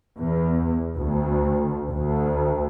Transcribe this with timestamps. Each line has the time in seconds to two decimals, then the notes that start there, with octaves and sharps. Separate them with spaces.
0.19 E2
0.96 D2
1.89 D2